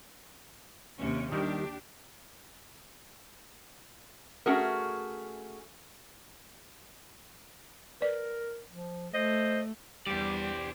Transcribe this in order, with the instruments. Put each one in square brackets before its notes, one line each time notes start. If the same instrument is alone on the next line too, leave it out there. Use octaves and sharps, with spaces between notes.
[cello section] D#2 C3 C#4
[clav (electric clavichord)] D#3 G3 [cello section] D4 G4
[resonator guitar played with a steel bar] A3 C#4 F#4 G#4 A#4
[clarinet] A#4 [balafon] B4 D5
[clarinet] F3
[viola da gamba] A3 [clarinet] C5 [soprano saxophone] D#5
[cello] E2 D4 [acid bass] G3 [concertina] G4 [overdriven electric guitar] C5 D5